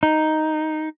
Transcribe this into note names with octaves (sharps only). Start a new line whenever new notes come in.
D#4